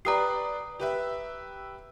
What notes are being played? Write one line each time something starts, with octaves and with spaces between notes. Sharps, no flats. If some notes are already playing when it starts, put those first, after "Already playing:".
G4 B4 D5 A#5 D#6 C7
G4 B4 E5